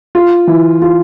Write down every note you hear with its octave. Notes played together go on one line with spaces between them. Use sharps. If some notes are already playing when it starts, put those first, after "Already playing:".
F4
E3
F4